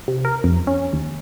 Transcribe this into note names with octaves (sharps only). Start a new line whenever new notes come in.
C3
A#4
F2
C#4
D#2